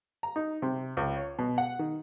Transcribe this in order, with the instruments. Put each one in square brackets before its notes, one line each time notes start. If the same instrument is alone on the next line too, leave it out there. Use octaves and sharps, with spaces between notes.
[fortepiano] A#5
D#4
C3
C#2
C#5
B2
F#5
D#3